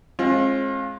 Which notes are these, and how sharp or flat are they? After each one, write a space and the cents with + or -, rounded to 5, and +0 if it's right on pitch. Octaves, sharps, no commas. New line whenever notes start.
G#3 +15 C4 +45 F4 +0